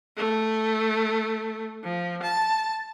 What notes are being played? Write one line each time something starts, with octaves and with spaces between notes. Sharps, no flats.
A3
F3
A5